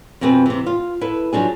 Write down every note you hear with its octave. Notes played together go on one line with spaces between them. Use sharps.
F2 B2 C4 G#4 B4
C3 E3
F4
E4 A4 B4
F3 F#3 D4 G#4